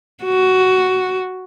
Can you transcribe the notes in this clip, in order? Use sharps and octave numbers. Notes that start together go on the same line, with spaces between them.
F#4